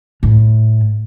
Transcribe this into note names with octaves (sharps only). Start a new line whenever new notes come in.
A2